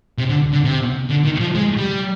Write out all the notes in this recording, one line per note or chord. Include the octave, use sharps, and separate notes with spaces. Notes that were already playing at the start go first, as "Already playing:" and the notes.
C3
D3
D3
C3
D3
D#3
F3
G#3
G3